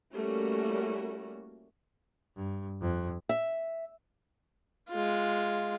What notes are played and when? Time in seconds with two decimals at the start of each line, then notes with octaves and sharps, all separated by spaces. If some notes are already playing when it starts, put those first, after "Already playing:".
0.14 G3 A3 A#3 C#4 E4 F#4
2.36 G2
2.81 F2
3.29 E5
4.89 G#3 F4